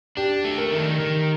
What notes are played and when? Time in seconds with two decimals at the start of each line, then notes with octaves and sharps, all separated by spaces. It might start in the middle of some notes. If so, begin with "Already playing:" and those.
0.17 D4 G4
0.44 A3
0.58 A#4
0.72 D#3
1.00 D#3